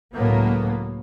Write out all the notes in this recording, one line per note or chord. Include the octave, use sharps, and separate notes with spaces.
C#2 A2 F#3 A#3 B3